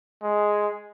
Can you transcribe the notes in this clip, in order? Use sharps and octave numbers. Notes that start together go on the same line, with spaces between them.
G#3